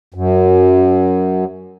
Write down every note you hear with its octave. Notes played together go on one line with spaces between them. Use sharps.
F#2